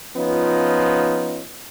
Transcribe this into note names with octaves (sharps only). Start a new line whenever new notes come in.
F3 B3 C#4 D#4 F4